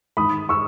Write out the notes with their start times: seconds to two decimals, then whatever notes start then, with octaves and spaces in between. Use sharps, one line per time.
0.17 G#2 D#3 B5 D#6
0.49 C#6 E6